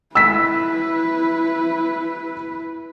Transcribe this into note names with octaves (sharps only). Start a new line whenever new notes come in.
E4 B4 E6 B6